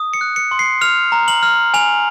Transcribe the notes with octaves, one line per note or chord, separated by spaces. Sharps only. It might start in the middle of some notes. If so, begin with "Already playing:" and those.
Already playing: D#6
C#7
F#6
C#7
C6
C7
F6 F7
A#5
F#7
F6
G#5 F7